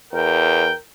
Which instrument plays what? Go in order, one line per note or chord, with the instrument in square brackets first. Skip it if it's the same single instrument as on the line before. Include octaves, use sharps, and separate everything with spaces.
[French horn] E2 [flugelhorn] A#4 [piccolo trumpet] G5